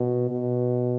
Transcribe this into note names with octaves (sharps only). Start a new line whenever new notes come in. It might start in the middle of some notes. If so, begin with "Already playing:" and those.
Already playing: B2
B2